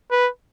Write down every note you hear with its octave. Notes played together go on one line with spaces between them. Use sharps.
B4